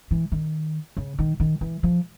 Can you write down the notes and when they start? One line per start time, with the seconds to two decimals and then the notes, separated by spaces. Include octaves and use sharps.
0.11 E3
0.32 D#3
0.97 C#3
1.19 D#3
1.40 D#3
1.61 E3
1.83 F3